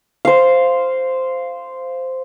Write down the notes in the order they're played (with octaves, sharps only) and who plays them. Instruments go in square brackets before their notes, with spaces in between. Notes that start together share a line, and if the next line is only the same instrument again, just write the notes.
[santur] C5 F5